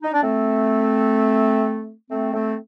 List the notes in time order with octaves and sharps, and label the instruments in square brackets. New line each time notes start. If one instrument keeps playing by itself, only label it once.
[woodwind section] D#4
D4
A3 C4
A3 C4
A3 C4